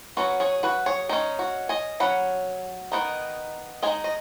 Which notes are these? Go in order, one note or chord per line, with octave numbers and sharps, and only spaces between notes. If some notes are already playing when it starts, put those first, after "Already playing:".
F#3 C#4 F#4 B4
G#4 C#5
F#4 B4
G#4 C#5
G#3 C#4 D#4
F#4
D#5 G#5
F#3 C#4 F#5 B5
D#3 B3 D#4
G#3 D#4 D#5 G#5
D#5